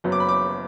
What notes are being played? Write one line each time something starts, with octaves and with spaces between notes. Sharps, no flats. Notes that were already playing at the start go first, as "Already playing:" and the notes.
F#1 F#2 F#3 B3
D6
B5
D6